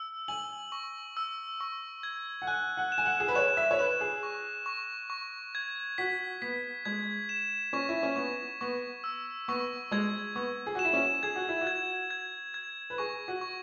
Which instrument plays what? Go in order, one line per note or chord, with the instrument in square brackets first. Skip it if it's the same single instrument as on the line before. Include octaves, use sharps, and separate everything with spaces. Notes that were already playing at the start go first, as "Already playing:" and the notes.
Already playing: [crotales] E6
[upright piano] G#5 [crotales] F#7
[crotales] C#6
E6
C#6
G#6
[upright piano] F#5
[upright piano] G#5 [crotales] F#6
[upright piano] F#5
[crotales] E7
[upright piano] G#5
F#5
G#4
B4
[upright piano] C#5 [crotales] E7
[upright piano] E5
C#5
[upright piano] B4 [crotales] E7
[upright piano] G#4
[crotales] C#6
C#6
C#6
G#6
[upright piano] F#4 [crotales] B6
[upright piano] B3 [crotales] B6
[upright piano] G#3 [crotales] G#6
[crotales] E7
[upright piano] C#4 [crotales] C#6
[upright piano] E4
C#4
[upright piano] B3 [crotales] C#6
[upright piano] B3 [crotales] C#6
[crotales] E6
[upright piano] B3 [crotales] C#6
[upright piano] G#3 [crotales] G#6
[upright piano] B3 [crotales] C#6
[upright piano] G#4
[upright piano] F#4 [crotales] E7
[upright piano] E4
C#4
[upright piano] G#4 [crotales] G#6
[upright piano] F#4
E4
F#4
[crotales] G#6
G#6
G#6
[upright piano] B4
[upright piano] G#4 [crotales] C#6
[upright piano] F#4
[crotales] C#6